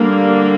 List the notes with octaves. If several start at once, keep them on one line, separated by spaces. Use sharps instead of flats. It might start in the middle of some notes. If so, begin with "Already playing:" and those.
Already playing: D3 G3 A#3